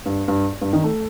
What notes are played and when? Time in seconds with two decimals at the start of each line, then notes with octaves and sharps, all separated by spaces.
0.06 G2
0.28 G2
0.61 G2
0.73 D#3
0.84 A3